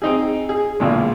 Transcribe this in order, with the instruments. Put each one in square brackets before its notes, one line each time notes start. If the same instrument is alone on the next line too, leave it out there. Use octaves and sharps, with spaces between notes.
[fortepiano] C4 D#4 G#4
G#4
B1 A#2 D3 G#3